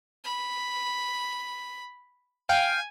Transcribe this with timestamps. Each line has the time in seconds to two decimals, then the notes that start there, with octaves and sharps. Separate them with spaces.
0.24 B5
2.49 F5 G5 G#5